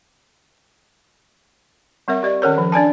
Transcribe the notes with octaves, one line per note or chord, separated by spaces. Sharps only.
G3 C4 A#4 E5
G4 D5 D#5
D#3 C#4 A#4 C#5
F3
D4 D5 G#5 A5